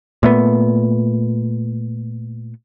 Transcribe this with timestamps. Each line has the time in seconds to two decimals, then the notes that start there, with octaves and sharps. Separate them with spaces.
0.23 A#2 A3 B3